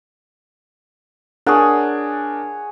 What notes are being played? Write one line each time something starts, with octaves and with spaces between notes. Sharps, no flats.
D4 G#4 A#4 C#5 D5 F#5